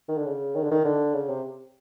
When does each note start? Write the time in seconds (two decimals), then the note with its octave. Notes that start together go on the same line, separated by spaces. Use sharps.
0.08 D#3
0.17 D3
0.26 C#3
0.55 D#3
0.63 D3
0.71 D#3
0.85 D3
1.14 C#3
1.29 C3